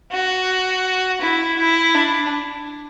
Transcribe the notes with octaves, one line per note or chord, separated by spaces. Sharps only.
F#4
E4
E4
D4